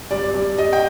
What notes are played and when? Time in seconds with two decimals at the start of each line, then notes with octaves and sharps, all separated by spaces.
0.11 G2 D5
0.34 G2
0.58 G3 D#5
0.73 G5